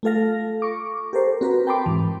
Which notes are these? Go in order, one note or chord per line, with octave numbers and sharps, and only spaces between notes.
A3 F4 A4 F5 A#6
C#6 D6
G4 A4 A#4 C5
C4 F#4 A#4 B4
G5 A5 B5 C6 D6
G#2 E3